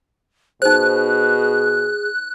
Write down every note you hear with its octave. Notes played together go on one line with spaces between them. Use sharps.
B2 D#4 G#4 C5 F#6